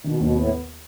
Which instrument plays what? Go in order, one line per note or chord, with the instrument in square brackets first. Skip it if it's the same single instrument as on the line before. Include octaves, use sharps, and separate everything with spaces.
[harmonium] B2 [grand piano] D#3
[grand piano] D#2 [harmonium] B2
[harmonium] A2 [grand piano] B3